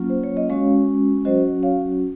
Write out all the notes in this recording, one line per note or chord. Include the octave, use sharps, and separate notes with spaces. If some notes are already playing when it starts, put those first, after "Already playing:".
Already playing: F#3 A#3 C#4 F4
C5
C#5
D#5
G#3 C#4 F#4 C#5 F5
F#3 C#4 F#4 C5 D#5
C#5 F5